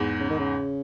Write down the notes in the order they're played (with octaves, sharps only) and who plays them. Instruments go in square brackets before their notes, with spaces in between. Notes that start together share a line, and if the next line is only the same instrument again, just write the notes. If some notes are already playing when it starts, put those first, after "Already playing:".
Already playing: [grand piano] E2 G#2
[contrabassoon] C#3
D#3
C#3